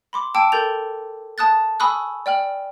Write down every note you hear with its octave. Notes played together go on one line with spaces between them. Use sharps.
B5 C6 D6
G5 A5 D6 E6 D7
A4 A#4 G6 A6 F7
A5 D#6 F#6 A6
G#5 B5 C#6 D#6 E6 F#6
D5 G5 F6 F#7